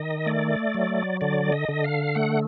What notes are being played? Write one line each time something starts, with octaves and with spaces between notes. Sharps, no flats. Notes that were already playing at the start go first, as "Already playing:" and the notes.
Already playing: D#3 D#5
A3 D5
F#3
D3 D5
D#5
D3
F5
A3 F#5